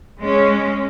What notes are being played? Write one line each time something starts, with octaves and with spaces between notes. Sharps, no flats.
G#3 C#4